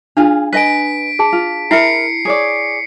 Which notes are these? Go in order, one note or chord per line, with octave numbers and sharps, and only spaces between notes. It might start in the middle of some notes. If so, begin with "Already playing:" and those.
D4 F4 G#4 F5
B4 D#5 G#5 B6 D7
G#4 A5
F4
E4 A#4 E5 B5 C7 C#7
G#4 C#5 D5